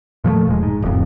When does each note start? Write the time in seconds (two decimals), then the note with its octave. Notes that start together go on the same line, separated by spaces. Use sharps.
0.24 A#2 F3 F#3 A3
0.48 E1 G#3
0.63 G#2
0.82 D1 F2